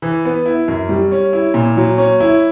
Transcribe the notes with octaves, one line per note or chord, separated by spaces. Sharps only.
E3
B3
E4
F#2
G3
C#4
E4
A#2
F#3
C#4
E4